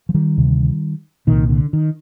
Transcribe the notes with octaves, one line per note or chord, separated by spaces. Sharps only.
F3
D#3 G3
D2 C3
C2 A#2 D#3
D3
D#3